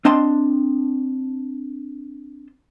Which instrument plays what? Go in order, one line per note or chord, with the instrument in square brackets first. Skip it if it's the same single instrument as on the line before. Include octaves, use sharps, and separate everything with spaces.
[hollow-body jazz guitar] C4 D4 D#5 A5 C6